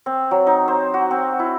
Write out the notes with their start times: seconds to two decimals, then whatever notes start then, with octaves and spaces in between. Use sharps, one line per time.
0.06 C4
0.31 F#3
0.47 D#4
0.68 C5
0.94 F#4
1.11 C4
1.39 E4